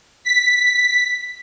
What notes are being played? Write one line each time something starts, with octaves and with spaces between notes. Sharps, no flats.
B6